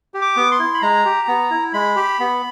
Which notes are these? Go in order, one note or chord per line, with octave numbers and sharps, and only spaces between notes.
G4
D6
B3
C6
E4
B5
G#3 A#5
G4
B3
E4
G#3 B5
G4
B3